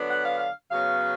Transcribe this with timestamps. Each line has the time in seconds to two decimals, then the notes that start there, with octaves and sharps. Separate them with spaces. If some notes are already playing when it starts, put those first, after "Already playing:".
Already playing: D3 F#3 B3 D4
0.09 F#5
0.24 F5
0.40 F5
0.70 C#3 F#3 B3 F5